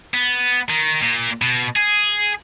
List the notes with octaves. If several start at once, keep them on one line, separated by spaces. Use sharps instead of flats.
B3
D#3
A#2
B2
G#4